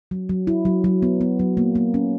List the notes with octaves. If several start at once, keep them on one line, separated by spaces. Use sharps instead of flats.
F#3
F#3
E4
F#3
F#3
B3
B3
F#3
A#3
A#3
C#4